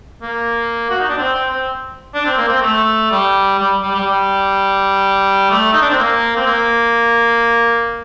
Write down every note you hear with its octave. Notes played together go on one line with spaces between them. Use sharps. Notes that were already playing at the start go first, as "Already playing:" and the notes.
A#3
F#4
D#4
D4
C4
C4
C4
D4
C4
A#3
C4
A3
G3
G3
G3
G3
G3
A3
D#4
D4
C4
A#3
C4
A#3